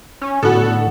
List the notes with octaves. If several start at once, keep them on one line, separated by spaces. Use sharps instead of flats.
C#4
A2 D3 B3 F#4 A4